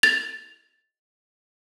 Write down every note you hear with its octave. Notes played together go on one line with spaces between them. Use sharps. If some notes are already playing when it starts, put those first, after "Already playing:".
A6 F7